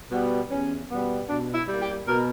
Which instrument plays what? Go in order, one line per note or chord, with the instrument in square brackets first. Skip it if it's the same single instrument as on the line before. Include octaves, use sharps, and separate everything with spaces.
[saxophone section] B2 G3 B3
E2 C#4
B2 G3 B3
B2 D4
E4
G3 A#3
G4
B2 A#4